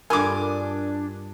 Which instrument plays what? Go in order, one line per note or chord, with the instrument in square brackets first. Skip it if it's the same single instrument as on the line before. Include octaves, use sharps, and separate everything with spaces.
[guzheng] G2 F4 [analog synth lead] D4 [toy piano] A#4 B5 D#6 [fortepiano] G#5 D6